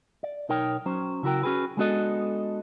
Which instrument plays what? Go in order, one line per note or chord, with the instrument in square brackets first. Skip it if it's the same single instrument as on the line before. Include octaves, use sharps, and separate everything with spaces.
[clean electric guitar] D5
B1 D#4 A#4 C#5 G5
F#3 C#4 C5
C#3 E4 F#4 A#4 G5
C#4 F#4 G#4 B4
G#3 B3 D4 F#4 A4 D#5